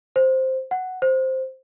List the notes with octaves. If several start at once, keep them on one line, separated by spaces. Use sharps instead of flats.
C5
F#5
C5